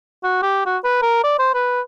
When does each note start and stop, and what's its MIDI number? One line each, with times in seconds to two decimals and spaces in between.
0.24 0.38 66
0.43 0.62 67
0.66 0.77 66
0.84 1.02 71
1.02 1.24 70
1.24 1.36 74
1.39 1.52 72
1.54 1.81 71